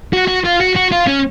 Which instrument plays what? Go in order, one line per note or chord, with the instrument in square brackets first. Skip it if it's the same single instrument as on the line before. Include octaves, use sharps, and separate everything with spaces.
[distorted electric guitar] F#4
F#4
F4
F#4
F#4
F4
C#4